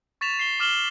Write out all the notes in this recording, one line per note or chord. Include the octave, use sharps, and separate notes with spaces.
C#6 A6 B6 E7 F7
C7 G7
D6 F6 E7 F#7 G7